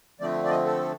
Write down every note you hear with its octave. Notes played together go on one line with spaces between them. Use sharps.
D3 F3 A3 C4 D5
D5
D#5
A4